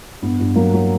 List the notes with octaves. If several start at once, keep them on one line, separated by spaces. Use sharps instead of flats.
G2 B3
G2
F#3 A#3
F#3